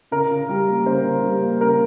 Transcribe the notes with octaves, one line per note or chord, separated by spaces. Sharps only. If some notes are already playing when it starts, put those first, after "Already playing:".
C#3 A#4
C#3
G3
A#3
C#3 C5
C#3
G3
A#3
C#3 A#4